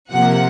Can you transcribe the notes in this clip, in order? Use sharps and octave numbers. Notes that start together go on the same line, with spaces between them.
C3 F3 A#3 F#5